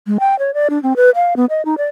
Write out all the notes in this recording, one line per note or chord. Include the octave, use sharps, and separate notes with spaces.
G#3
G5
C#5
D5
D4
C4
B4
F5
B3
D#5
D#4
D5